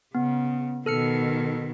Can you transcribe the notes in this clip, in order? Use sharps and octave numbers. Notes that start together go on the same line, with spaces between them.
C#3 B3
B2 D#3 A4 F6 C#7